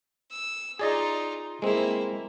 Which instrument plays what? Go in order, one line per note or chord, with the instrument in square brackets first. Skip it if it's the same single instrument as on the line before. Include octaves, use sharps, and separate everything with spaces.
[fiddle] E6
[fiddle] D#4 F4 [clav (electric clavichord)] G#4 D5 D#5
[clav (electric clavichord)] G#3 C4 [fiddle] A#3 E4